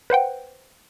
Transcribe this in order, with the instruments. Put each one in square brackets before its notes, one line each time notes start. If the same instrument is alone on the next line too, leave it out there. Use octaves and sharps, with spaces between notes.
[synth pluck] B4 C5 F#5 G5